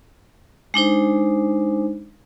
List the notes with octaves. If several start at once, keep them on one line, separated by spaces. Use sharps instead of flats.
G#3 D4 D#4 C5